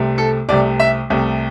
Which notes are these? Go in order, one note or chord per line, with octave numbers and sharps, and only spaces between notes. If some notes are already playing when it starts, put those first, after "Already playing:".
Already playing: C2 C3 A3
A4
C2 C3 A3 D5
E5
C2 C3 A3